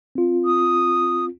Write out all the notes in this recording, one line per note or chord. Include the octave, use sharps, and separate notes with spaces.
C4 F4
D#6